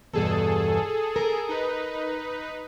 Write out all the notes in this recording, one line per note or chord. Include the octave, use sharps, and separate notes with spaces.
E2 G2 B2 G#4 A4
A#4
D#4 B4